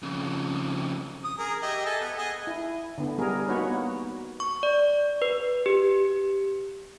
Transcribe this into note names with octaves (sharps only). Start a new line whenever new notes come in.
F2 C#3
D#6
G#4 A#4
G4 D#5 E5
A4 D#5 G#5
B3
G#4 D#5 G#5
E4
D3 B3
G3 G#4 A#4
A#3 B3 D#4 F#4 B4 C#5
C#6
D5
B4
G4